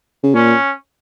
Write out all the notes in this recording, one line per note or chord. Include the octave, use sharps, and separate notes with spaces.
C#3
A#2 C#4